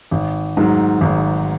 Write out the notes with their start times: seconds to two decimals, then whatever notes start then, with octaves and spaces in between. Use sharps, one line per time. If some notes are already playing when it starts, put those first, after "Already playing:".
0.11 G#1
0.57 G#2 D#3 F#3
1.01 G#1